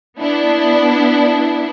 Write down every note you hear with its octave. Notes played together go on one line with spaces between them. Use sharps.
B3 D4 E4